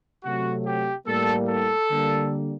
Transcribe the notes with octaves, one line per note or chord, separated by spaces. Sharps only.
C3 F#3 A3 F#4
G4
A2 G3 A#3 A4
A4
D3 G3 A#3